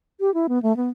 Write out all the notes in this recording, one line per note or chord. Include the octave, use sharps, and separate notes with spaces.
G4
E4
B3
A3
B3